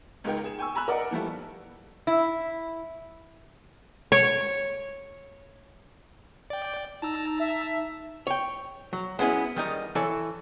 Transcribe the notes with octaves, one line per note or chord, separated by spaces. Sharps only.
C#2 G#3 D#4 A#4 G5
G#4 E7
G5 G#5 C#6 E6
G#5 A#5 B5 E6 F#6
A#4 D5 D#5 F#5
E3 F3 G3 A3
E4
C#5
D5 G5
D#4 A5 A#5 E6
E5
C#5 G5
F#3
G#3 B3 C#4 E4
D#3 G3 D#4
E3 A4 C#5